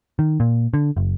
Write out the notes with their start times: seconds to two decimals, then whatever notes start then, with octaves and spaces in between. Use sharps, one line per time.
0.19 D#3
0.40 A#2
0.74 D3
0.97 F#1